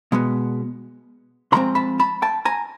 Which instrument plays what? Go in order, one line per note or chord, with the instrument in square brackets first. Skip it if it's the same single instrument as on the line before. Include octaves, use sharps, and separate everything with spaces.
[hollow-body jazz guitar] B2 G#3 B3
C#3 F3 G#3 C4 A#5 C6
A5 B5
A5 B5
G5 A5
G#5 A#5